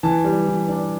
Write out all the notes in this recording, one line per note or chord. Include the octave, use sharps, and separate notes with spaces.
E3 A5
G3
E3
D4